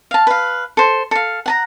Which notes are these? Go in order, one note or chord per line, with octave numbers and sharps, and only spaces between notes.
F5 A5
B4 F5
A4 C5
A4 F5
F#5 A5 A#5